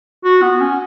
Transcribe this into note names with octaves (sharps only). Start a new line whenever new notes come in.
F#4
B3
C#4